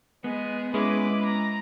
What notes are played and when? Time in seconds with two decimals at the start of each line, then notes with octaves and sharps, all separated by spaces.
0.24 G#3 B3
0.74 G#3 C#4 E4 B4 D6
1.25 A#5